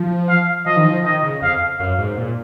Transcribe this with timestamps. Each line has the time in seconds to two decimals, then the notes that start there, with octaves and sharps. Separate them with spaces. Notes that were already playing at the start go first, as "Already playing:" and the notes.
Already playing: F3
0.29 F5
0.66 F3 D#5
0.77 D#3
0.85 F3
1.04 D#3 D#5
1.23 C#3
1.42 F2 F5
1.80 F#2 F5
1.98 G#2
2.18 A#2